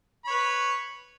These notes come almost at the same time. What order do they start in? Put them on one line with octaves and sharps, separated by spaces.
B5 C#5 B4